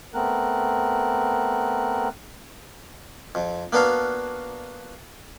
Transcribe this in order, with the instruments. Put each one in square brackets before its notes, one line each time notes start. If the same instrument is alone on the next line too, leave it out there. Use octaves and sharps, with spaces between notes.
[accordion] A3 B3 C4 A#4 F#6
[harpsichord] F2
A#3 B3 D4 F#4 F5